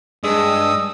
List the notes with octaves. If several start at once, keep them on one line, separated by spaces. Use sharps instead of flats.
G2 G#3 D#5 D#6 E6